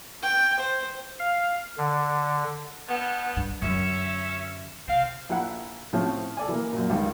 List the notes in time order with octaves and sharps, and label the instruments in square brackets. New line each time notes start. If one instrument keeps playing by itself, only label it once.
[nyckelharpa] G5
C5
[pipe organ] F5
D3
[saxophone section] G2 B3
[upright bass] G2
[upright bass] F#2 D3 [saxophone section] C#4 E5
[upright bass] C3 [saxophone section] C4 F5
[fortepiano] A#1 E4 F#5
A2 F3 A3 C4 C#4
A4 D5 G#5
E3 A#3
F#2 A#2
C#2 G2 D#3